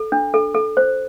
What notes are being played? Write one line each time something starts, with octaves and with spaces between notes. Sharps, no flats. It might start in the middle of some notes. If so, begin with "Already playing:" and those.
Already playing: A4
D4
A4
A4
C5